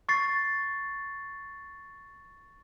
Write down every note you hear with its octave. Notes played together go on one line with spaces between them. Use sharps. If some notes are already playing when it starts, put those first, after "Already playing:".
C#6 A6 C7